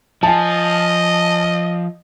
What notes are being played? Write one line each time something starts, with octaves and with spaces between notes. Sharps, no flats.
F3 D#5 G#5 A5